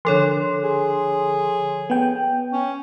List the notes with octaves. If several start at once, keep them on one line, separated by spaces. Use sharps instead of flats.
D3 F3 A4 C#5 C6
G#4
B3 G5
C#4